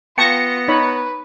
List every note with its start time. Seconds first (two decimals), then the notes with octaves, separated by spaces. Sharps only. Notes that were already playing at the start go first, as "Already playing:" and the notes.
0.18 B3 F4 G5 A5 C#6 A#6 C#7
0.68 D#4 B4 C#5 B5